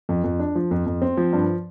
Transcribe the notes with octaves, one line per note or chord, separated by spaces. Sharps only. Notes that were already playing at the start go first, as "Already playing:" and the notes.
F2
F2
D4
F3
F2
F2
C4
F3
G2